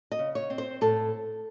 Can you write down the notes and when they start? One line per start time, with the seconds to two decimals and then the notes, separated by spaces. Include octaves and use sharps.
0.11 D#5
0.19 C#3
0.35 C#5
0.50 C4
0.58 C5
0.81 A2 A4